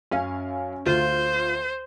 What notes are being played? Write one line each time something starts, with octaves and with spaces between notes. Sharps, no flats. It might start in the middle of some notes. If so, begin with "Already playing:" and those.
F#2 C#4 F5 G#5
D2 F4 C5